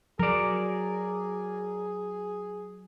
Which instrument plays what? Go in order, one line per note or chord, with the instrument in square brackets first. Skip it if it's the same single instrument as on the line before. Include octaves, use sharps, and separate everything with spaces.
[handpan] F#3 [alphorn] G#4 [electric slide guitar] A#4 D5